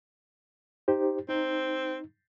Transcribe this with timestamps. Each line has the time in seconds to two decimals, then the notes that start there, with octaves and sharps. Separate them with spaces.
0.88 D#4 G4 C5
1.29 C4 D#4